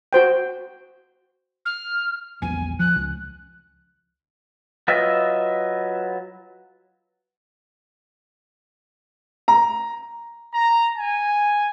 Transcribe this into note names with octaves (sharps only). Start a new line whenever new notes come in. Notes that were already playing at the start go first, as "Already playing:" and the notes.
F#4 C5 G5
F6
A#1 E2 G#5
F3 F#6
C#2
F#3 F4 B4 D#5 E5
A#5
A#5
G#5